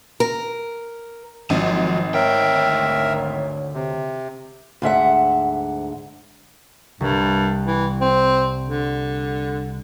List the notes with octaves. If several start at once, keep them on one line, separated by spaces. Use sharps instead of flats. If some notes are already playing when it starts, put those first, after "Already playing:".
A#4
G#1 F3 F#3
D2 A#4 C#5 E5 G5
C3
D2 G#2 E5 F#5
C2 G2
E3
C4
D3